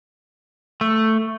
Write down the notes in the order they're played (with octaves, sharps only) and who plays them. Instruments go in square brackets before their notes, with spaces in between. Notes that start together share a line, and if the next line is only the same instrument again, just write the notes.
[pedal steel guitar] A3